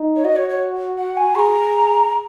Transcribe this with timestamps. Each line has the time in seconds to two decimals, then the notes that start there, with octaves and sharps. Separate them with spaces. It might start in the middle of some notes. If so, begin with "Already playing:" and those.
Already playing: D#4
0.16 C#5
0.24 F#4 D#5
0.36 C#5
0.49 C#5
0.98 F#5
1.17 G#5
1.35 G#4 A#5 C#6